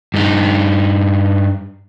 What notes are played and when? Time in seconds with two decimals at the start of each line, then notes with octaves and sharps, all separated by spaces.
0.14 G2 D#4